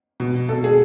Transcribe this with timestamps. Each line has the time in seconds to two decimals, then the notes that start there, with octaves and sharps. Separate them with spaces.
0.20 B2
0.49 B2 A4
0.64 G#4